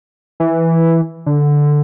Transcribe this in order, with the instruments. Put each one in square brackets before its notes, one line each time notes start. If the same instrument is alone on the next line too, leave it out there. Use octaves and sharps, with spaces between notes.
[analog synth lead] E3
D3